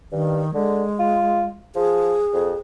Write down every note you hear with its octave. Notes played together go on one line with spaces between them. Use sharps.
G2 D#3
D3 G#3
F4
F3 G#4
F2